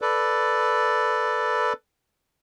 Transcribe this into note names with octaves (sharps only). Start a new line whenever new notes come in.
A4 B4 D5